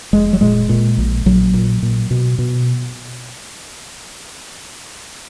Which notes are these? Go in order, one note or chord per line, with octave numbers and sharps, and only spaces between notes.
F1 G#3
F#3
A#2 G#3
A#2
A#1
A#1 F#3
A#2
A#2
B2
B2